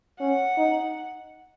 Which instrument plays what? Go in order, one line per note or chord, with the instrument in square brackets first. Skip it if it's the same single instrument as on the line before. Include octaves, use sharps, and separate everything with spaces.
[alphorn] C#4 [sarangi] F#5
[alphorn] D#4